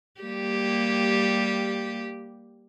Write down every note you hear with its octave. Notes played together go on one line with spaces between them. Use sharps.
G3 A#3 G4